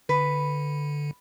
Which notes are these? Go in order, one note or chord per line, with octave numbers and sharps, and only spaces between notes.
D3 B4